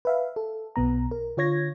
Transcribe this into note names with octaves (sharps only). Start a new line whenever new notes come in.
B4 E5 F5
A4
B1 B2 B3 A#5
A#4
D3 F4 C#5 G#6 A#6